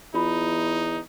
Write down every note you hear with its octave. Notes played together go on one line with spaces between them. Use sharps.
E2 D#4 F4 B5